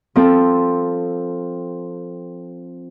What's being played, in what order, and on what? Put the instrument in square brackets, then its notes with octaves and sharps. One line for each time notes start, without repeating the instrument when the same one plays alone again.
[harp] F3 C4 A4